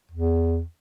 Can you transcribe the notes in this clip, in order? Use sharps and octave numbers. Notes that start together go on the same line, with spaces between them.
E2